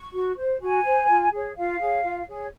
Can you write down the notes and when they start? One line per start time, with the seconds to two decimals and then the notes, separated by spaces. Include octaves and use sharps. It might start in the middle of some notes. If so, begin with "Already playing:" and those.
Already playing: C#6
0.13 F#4
0.37 C5
0.61 F#4 G#5
0.85 C5
1.09 F4
1.32 G#4 C#5
1.56 F4 F5
1.80 G#4 C#5
2.03 F4
2.28 G#4 C#5